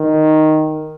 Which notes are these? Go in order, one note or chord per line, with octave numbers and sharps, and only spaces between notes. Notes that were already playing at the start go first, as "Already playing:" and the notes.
Already playing: D#3